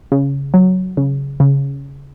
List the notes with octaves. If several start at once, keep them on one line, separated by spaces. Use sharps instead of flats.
C#3
F#3
C#3
C#3